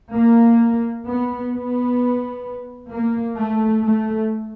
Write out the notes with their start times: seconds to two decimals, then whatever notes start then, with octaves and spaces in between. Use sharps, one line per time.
0.15 A#3
1.07 B3
1.53 B3
2.92 A#3
3.38 A3
3.84 A3